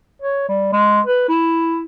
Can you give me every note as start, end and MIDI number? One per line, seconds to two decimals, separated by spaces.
0.22 0.46 73
0.49 0.68 55
0.72 1.01 56
1.06 1.26 71
1.28 1.85 64